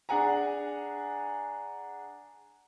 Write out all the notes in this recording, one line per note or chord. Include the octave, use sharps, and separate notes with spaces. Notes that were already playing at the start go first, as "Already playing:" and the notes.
D4 G#4 F#5 G#5 A#5